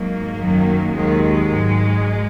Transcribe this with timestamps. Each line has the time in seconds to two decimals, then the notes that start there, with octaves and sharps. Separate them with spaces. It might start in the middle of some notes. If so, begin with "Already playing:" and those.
Already playing: G#2 F#3 A#3
0.39 F#2 D#3 F#3
0.95 D#2 D#3 F#3 G#3
1.51 G#2 F#3